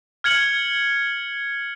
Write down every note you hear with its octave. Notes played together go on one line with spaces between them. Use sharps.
F6 G#6 C#7 F#7